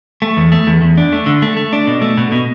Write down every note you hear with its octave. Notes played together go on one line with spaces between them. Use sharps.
A3
E2
A3
E2
E2
D4
A3
D3
A3
A3
D4
B2
A3
B2
B2